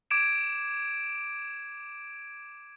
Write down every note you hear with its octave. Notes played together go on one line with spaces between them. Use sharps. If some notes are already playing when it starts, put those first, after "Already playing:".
D6 G#6 D7 E7